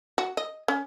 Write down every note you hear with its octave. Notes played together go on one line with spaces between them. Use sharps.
F#4
D#5
C#4